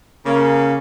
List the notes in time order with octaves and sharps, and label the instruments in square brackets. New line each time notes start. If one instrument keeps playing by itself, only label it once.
[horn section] C#3 A#3